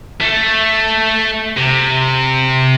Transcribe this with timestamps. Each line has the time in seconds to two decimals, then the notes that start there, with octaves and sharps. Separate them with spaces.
0.20 A3
1.57 C3